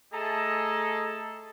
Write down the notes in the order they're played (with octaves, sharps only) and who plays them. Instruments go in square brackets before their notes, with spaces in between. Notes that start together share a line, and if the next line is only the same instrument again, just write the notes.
[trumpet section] A3 G#4 A4 D#5 A5 A#5